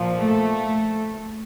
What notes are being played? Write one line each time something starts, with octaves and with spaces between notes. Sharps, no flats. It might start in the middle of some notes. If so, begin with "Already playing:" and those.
Already playing: A#2 F3
A3